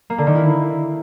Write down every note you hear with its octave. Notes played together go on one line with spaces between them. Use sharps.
A#3
D3
D#3
E4